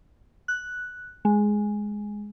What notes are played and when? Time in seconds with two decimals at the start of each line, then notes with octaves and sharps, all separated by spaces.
0.48 F#6
1.25 G#3